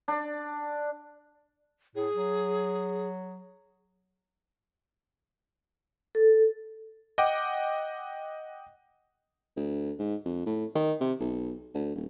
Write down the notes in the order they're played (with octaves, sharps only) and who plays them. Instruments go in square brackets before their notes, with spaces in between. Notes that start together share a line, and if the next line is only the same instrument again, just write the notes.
[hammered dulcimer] D4
[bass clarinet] A2 [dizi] G#4
[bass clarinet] F#3
[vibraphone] A4
[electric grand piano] D#5 F#5 G5 D6
[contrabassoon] D2
G#2
F2
A2
D#3
C3
B1
D2
D#1